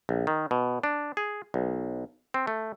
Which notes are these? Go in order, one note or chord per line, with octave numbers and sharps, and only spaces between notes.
A#1
D#3
B2
D4
G#4
B1
C4
A3